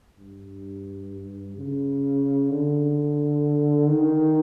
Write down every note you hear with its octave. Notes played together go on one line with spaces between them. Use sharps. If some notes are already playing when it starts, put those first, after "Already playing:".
G2
C#3
D3
D#3